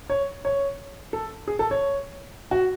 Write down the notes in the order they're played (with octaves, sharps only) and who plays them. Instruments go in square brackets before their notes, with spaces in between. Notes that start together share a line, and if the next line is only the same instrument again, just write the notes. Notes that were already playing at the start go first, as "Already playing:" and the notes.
[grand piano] C#5
C#5
A4
G#4
A4
C#5
F#4